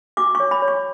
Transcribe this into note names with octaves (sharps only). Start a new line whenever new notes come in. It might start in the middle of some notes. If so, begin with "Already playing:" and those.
F#4 D6
C#6
C#5
B5
C#5
C#6